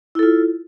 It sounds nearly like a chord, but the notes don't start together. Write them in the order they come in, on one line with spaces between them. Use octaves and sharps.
E4 A4 F4